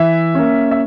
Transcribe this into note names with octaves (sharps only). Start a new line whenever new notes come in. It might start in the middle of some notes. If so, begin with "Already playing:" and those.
Already playing: E3 E5
A#3 C#4
E5